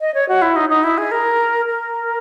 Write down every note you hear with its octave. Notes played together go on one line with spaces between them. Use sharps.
D#5
C#5
F#4
E4
D#4
D#4
E4
G#4
A#4
A#4